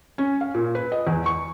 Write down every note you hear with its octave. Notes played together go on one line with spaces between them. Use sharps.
C#4
F5
A#2
B4
D#5
E2
C#6